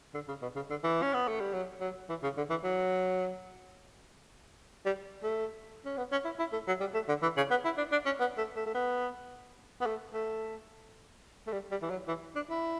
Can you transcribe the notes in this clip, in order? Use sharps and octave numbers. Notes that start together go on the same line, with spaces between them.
D3
C#3
B2
C#3
D3
E3
C#4
B3
A3
G3
F#3
F#3
E3
C#3
D3
E3
F#3
G3
A3
C#4
B3
C#4
E4
E4
A3
F#3
G3
A3
D3
E3
C#3
B3
E4
D4
D4
C#4
B3
A3
A3
A3
B3
B3
A3
A3
A3
G3
G3
E3
F#3
E3
D4
E4